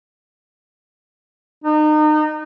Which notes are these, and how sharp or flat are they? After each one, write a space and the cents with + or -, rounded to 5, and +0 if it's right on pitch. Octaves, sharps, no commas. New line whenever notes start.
D#4 -30